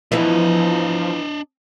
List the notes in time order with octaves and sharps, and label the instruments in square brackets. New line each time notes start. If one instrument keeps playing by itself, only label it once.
[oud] E3 B3 E4 [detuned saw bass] F3 [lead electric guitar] D4 D#5